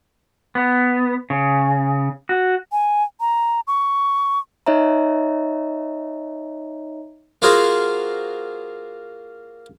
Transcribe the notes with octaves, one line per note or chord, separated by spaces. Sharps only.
B3
C#3
F#4
G#5
A#5
C#6
D#4 C#5 D#5 E5 A#5
A#3 F4 F#4 G#4 A#4 C5